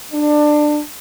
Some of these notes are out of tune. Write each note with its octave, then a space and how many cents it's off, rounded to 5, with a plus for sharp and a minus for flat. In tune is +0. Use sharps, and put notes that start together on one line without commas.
D4 +20